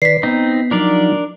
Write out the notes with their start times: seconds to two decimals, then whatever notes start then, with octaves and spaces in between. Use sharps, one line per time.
0.02 D#3 B4 D5 B6 C7
0.23 B3 C4 D#4
0.71 F3 F#3 D4 D#4 A#4 D5